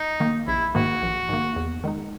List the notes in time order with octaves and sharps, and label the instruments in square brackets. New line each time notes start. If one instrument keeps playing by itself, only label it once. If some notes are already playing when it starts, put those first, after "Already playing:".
Already playing: [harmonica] D#4
[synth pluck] D#3 A#3
[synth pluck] A#1 [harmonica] E4
[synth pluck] G#2 D#3 A#3 [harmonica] F#4
[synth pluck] A#1
G#2 D#3 A#3
E2
D#3 G#3 D#4